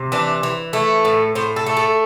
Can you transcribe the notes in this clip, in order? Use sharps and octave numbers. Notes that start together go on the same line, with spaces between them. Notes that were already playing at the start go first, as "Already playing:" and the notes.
Already playing: C3
E3 D4
E3
A3 E4
A2
A2 C5
A4
A3
A4